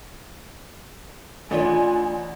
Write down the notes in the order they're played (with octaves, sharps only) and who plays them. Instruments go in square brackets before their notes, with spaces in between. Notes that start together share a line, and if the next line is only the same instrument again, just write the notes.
[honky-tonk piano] A1 D4 [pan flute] F4 [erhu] G#5